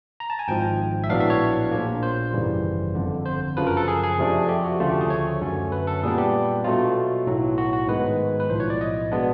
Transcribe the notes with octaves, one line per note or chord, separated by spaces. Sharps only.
A#5
A5
G#5
G#1 G#2 F3 G5
E5
A#1 A2 F#3 B3 D4 F5
E5
C#5
A#1 A#2 F3 A#3
C5
G#1 F#2 C#3 E3 G3
G1 F2 D3
C5
F#2 C#3 F3 B4
A#4
A4
G#4
G#4
F2 C3 F3 A3 D4
G4
F#4
D2 C#3 F3 A3 F4
G4
G#4
C#5
F#2 D3 F#3 A3 C#4
B4
A4
A#2 G3 B3 D4 G#4
G4
B2 F#3 A3 F4
B1 A2 F#3
F#4
F#4
G#2 D#3 G#3 B3 B4
B4
B1 A2 F3 C5
C#5
D5
D#5
B2 G#3 B3 D4